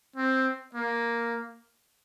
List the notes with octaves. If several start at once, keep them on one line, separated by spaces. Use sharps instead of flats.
C4
A#3